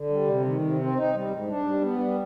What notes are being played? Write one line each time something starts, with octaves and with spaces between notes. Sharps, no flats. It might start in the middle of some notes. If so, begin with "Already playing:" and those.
Already playing: D3
G3
C3
D#3
C3
C4
D#4
G3
G#2
D4
G3
B3
G3